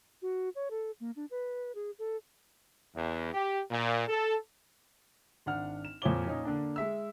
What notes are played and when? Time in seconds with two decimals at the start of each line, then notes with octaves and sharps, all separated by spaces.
0.22 F#4
0.55 C#5
0.71 A4
1.00 A#3
1.16 D4
1.31 B4
1.75 G#4
1.99 A4
2.95 E2
3.33 G4
3.70 A#2
4.07 A4
5.46 G#1 D4 F#5 F6
5.85 E7
6.02 F2 A#2 A#3 C#5 D6 G7
6.27 A#2 C#4 D#4
6.45 D3 A#3 D4
6.76 G#3 E5 E6